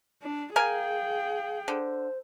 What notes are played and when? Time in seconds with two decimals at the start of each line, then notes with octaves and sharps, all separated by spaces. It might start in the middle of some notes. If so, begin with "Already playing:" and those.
0.22 D4
0.56 G#4 A#4 F5 G5 G#5
1.68 D3 C5